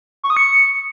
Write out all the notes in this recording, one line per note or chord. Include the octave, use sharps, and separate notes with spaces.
C#6
D#6
C#7